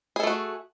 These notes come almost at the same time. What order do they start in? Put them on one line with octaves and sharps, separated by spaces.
G#4 A4 A3 F#4